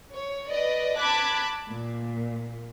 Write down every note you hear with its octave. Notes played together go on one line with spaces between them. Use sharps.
C#5
B4 D5 D#5
A5 B5 D6 F#6 G#6 B6
A#2